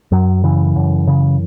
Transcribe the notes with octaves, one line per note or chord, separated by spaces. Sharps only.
F#2 F#3
C#3 E3
F#2
C#3